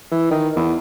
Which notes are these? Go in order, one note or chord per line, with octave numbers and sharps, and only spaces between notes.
E3
D#3
E2